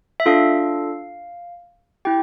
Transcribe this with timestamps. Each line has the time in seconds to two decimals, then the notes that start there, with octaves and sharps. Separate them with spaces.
0.20 E5
0.26 D4 F4 A4 F5
2.05 E4 G4 G5